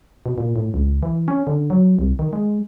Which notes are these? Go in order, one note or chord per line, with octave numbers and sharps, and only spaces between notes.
B2
A#2
A2
C#2
E3
C#4
D3
F#3
C2
D#3
G#3